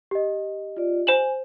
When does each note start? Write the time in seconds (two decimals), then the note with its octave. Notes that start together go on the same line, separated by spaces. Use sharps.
0.11 G4 D#5
0.77 F4 D5
1.07 C5 G#5 E7 F#7